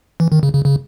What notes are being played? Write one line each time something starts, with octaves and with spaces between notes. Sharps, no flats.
E3
D#3
C#3
C#3
C#3